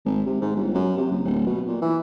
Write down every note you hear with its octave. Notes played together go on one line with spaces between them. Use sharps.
G#1
C3
G#2
G1
F#2
C3
F#1
D1
B2
A#2
E3